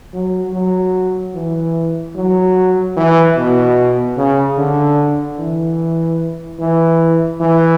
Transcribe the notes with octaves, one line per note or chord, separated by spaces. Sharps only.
F#3
F#3
E3
F#3
E3
B2
C#3
D3
E3
E3
E3